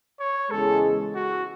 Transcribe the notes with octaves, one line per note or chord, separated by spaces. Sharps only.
C#5
E2 C#3 G#3 A4
F#4